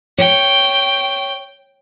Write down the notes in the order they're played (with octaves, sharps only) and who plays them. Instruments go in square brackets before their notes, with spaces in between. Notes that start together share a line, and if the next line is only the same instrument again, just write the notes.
[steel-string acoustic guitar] C#5 [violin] G5